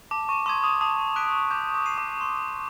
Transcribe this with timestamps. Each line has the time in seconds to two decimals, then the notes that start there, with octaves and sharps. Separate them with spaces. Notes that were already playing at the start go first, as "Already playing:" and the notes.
0.11 A5 D6
0.29 C#6
0.46 C6 D6 D#6 G#6
0.64 D#6
0.81 A5 D#6
1.16 C#6 F#6 B6 D7
1.51 D6 G6
1.74 D6
1.86 C7 D#7
1.98 D6
2.21 C6